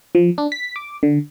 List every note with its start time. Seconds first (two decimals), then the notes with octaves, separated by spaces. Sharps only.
0.15 F3
0.38 D4
0.52 B6
0.76 D6
1.03 D3